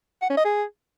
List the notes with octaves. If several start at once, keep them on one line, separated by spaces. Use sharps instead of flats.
F#5
C#4
D#5
G#4